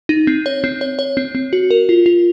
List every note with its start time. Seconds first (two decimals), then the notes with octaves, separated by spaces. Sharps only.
0.09 D#4
0.27 C4
0.46 C#5
0.64 C4
0.81 C#5
0.99 C#5
1.17 C4
1.35 C4
1.53 F#4
1.71 A#4
1.89 F4
2.06 F4